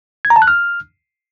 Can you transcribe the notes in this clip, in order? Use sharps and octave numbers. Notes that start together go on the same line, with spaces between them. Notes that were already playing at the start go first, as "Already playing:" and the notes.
G#6
A#5
A5
F#6
F6